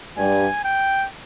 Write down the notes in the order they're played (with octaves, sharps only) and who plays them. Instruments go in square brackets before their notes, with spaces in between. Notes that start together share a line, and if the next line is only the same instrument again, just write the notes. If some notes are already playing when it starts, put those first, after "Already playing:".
[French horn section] G2 G3 [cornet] G#5
[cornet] G5